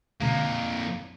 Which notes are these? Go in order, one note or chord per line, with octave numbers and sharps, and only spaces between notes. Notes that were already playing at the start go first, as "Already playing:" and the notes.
F2 B2 D3 G#3 A#3 F5 A#5